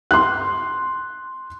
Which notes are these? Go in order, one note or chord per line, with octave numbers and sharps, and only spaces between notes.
C6 F#6